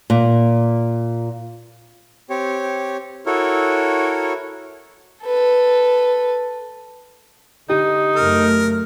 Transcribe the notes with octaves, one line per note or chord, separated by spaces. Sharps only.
A#2
C4 G4 C#5
E4 F#4 A4 A#4 C#5
A4 B4
D3 D#4 G4
F#2 C#3 A3 A#4